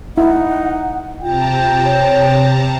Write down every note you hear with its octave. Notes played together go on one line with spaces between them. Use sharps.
D#4 E4 F#5
C3 F4 G5 A5 A#5
C#5